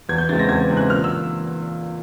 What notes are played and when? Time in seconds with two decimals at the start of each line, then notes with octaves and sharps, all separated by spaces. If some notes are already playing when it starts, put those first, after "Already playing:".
0.09 E2 G#6
0.18 G6
0.29 C#3 E3 G#3 C4 A6
0.39 A#6
0.49 E2 G#6
0.69 C#3 E3 G#3 C4
0.77 F#6
0.90 A#2 F6
1.04 E6